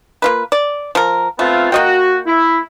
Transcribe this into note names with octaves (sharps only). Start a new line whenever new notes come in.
A#3 F4 B4
D5
F3 A#4
A3 B3 C4 F4
A#3 F#4 D#5 G5
E4